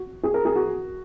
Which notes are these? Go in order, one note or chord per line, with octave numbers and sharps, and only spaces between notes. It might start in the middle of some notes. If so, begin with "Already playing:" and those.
Already playing: F#4
G#4
A#4
G#4
F#4